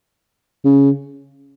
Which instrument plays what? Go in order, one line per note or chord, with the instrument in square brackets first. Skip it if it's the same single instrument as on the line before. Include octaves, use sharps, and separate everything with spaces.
[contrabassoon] C#3